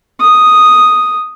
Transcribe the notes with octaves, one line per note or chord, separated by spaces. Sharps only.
D#6